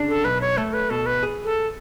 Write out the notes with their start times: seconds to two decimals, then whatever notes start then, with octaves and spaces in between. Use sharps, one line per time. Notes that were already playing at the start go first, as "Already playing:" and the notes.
Already playing: C#3 D4
0.08 A4
0.25 B1 B4
0.41 C#5
0.57 A3 A4
0.73 B4
0.90 B2 A4
1.06 B4
1.23 G#4
1.44 A4